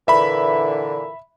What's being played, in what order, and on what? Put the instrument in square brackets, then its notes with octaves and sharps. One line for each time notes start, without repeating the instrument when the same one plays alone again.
[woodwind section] A#2 D3 E3 [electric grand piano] E5 B5